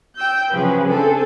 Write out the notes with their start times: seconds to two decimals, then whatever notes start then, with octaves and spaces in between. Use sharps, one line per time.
0.16 G5 E6 G6
0.51 C#3 F3 F#3 G#4 B4
0.88 C4 D4 G#4 A4